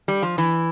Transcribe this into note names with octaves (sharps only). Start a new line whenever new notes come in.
G3
F3
E3